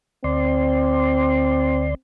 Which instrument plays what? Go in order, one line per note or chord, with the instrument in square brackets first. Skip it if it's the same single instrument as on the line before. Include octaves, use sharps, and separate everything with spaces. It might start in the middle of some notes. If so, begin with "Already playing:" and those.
[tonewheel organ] D2 D5 C6 [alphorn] C4